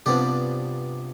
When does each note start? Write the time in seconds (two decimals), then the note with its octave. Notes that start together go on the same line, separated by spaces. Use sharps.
0.06 G2 C3 F3 B3 D4 G4